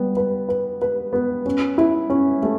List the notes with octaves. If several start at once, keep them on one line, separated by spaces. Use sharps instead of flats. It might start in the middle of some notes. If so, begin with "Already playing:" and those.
Already playing: G3 B3
B4
B4
B4
B3
C#4
E4
C#4
A3